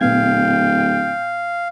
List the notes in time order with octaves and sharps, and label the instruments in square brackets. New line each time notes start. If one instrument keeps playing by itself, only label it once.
[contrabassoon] D1 [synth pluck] A#2 B3 G#6 [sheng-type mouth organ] F5 [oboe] G5